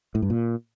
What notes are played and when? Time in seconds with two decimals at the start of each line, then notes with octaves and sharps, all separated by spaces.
0.15 A2
0.22 G2
0.30 A#2